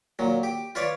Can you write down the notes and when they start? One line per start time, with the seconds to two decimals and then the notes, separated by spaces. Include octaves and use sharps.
0.19 A#2 F#3
0.43 G4
0.75 F4 B4 C#5 D5